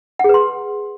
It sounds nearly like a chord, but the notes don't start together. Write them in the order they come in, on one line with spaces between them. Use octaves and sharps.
F#5 G#4 B4 C6